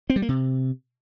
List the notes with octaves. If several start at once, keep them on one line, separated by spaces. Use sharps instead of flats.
C4
G3
A#3
C3